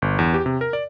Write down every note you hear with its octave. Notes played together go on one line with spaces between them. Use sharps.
G1
E2
G4
C3
A#4
D5